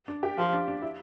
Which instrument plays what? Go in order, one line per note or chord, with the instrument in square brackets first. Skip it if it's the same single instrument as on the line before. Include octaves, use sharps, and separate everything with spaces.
[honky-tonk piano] D4
G4
[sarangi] F3 [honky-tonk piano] G4
[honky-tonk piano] D4
D4
E4